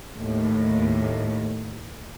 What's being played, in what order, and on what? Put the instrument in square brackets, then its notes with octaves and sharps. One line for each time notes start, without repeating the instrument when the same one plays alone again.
[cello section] D#2 A2